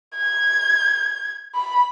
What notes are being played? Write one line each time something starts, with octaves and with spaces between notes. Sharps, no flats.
G#6
B5